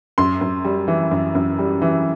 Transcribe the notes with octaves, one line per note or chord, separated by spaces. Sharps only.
F#2 C6
F#2
G3
E3
F#2
F#2
G3
E3